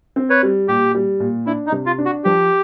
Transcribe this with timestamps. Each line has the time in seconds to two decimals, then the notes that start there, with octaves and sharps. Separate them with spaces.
0.16 C4
0.30 B4 C#5
0.43 G3
0.68 A#2 G4
0.95 G3
1.20 A#2
1.46 D4 E4
1.67 D#4
1.72 C3
1.86 F4
1.98 D4
2.05 F#4
2.24 F3 G4